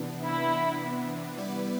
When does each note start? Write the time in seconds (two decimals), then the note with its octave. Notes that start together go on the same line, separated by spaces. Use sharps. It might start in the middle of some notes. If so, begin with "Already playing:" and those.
Already playing: C3 E3 B3 D4
0.23 E4
1.37 G3 B3 E4 B4 D5